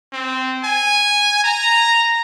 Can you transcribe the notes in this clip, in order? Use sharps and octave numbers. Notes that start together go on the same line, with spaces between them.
C4
G#5
A#5